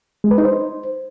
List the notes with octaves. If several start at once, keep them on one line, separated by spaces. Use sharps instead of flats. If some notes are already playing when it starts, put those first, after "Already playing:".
G#3
B4
D#4
C5